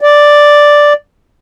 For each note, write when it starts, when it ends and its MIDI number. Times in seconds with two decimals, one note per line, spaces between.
0.01 0.93 74